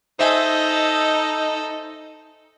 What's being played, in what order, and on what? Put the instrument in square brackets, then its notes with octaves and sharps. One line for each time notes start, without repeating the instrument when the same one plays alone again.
[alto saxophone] D#4 [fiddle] A4 D#5 [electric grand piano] C5 E5 G#5